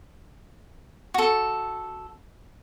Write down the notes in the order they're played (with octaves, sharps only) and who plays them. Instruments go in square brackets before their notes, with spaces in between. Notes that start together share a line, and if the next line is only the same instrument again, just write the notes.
[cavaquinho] F#4 A4